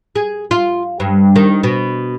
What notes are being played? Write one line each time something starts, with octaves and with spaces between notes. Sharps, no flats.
G#4
F4
G2
D#3
B2